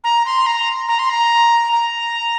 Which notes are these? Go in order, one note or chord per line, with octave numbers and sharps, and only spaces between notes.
A#5
C6
A#5
A#5
C6
A#5
A#5